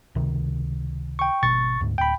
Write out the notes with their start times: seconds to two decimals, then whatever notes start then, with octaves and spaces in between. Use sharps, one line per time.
0.15 C#2 C3 D#3
1.19 G5 C#6
1.43 G#1 B2 C#6 A6
1.81 D2 G#2
1.98 D1 G5 B5